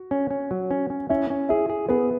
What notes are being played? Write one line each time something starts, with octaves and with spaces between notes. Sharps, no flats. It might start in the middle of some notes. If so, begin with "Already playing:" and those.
Already playing: F#4
C#4
C#4
F#3
C#4
C#4
C#4 E4 E5
C#4
E4 G#4 E5
G#4
B3 G#4 B4